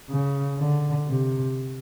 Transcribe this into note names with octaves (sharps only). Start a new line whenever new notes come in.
C#3
D3
C3